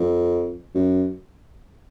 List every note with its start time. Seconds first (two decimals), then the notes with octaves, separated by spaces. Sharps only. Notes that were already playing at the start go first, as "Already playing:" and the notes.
Already playing: F2
0.75 F#2